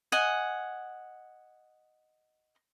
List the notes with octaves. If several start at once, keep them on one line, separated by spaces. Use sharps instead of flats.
D#5 F#5 G#5